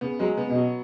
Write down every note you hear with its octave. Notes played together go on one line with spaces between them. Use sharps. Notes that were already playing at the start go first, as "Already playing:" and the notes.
C#3 B3
F#3 G#3
C#3 B3
B2
F#3